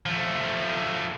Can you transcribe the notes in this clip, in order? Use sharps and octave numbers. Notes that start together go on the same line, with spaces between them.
F3 A3